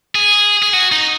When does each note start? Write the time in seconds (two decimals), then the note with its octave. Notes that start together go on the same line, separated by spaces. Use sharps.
0.15 G#4
0.63 G#4
0.73 F#4
0.92 D#4